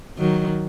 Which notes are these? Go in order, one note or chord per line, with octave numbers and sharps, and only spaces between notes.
D#3 F#3